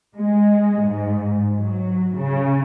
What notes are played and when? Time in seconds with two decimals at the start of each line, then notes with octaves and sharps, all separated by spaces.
0.16 G#3
0.81 G#2
1.57 F#3
2.16 C#3